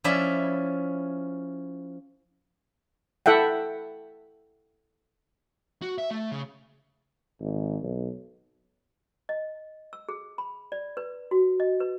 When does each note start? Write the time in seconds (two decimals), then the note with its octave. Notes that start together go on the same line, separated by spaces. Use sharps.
0.04 F3 C#4 E4 D5 E5
3.26 E4 A4 E5 F#5 G5
5.82 F#4
5.98 E5
6.11 A3
6.32 C#3
7.40 G#1
7.83 B1
9.29 D#5
9.93 E6
10.09 G#4
10.38 B5
10.72 D5
10.97 B4
11.31 F#4
11.60 D#5
11.80 B4